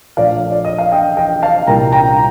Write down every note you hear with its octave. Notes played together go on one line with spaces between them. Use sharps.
A#1 A#2 A3 D5 F5
D5
D#5
F5
D#5 G5
D#5 G5
F5 A5
C2 A#2 G3 A#3 G5 A#5
G5 A#5